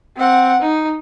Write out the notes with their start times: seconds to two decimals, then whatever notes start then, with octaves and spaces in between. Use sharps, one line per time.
0.17 C4 F#5
0.61 D#4